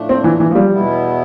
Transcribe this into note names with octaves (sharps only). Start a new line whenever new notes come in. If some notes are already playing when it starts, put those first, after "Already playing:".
Already playing: A2 F3 A3 D4
C4
E3
E3
F3
G3
E2 B2 B3 E4